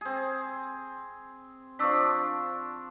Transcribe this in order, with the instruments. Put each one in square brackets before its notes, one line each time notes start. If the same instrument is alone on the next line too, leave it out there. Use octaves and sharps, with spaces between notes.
[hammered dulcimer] C4 G#4
[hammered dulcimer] F3 D4 [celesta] C#6 E6 B6